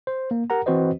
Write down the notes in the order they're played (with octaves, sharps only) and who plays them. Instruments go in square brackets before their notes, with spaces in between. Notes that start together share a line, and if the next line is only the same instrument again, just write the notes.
[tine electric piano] C5
A#3
G4 A#4 F#5 A#5
E3 C4 F#4 B4 C5 D#5